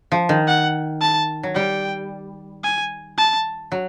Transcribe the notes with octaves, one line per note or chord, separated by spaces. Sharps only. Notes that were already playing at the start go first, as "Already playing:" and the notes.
F3
D#3
F#5
A5
F#3
G3 G5
G#5
A5
F#3